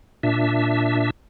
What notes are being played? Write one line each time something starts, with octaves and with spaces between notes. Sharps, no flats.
A#2 D4 E5